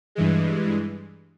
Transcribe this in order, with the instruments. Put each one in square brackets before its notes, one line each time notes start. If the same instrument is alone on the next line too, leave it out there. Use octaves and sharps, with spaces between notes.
[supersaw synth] G2 E3 G#3